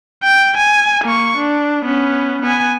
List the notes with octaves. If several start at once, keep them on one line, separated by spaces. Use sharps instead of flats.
G5
G#5
A#3 C#6
D4
B3 C#4
B3 G#5